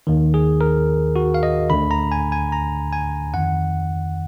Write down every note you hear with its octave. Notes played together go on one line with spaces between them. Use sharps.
D#2 D#3
G#4
A#4
F#4
F5
D#5
D2 D3 B5
A#5
G#5
G#5
A#5
G#5
F2 D#3 F#5